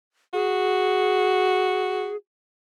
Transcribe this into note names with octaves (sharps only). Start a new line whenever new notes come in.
F#4 G#4